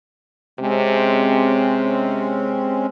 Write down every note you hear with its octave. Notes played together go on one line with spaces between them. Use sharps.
C3 G#3 C4 C#4